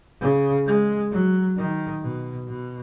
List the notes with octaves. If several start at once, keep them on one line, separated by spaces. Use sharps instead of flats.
C#3
G#3
F#3
D#3
B2
B2